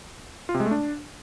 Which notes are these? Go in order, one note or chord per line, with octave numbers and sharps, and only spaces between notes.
F4
C3
G#3
A3
D4